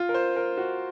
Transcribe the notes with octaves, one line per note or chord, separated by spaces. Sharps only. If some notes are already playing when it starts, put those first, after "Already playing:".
Already playing: F4
A#4
C5
A#4
F#4